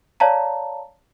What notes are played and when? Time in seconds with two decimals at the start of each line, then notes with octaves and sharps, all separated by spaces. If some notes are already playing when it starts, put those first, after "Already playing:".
0.20 C#5 D5 F5 A5 A#5